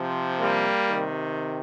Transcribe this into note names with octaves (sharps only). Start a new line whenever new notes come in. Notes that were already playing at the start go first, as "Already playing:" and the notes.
Already playing: C3 F3
G3 A#3
C3 D#3